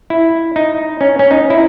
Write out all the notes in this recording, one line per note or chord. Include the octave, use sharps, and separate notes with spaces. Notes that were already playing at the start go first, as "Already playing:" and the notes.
E4
D#4
C#4
C#4
D#4
E4